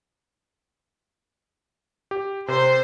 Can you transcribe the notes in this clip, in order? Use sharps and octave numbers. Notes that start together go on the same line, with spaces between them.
G4
C3 C5